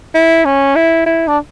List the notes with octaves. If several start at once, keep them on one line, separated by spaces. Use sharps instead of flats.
E4
C#4
E4
E4
D4